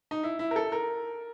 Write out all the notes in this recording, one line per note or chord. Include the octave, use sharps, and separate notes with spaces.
D#4
E4
E4
A#4
A4
A#4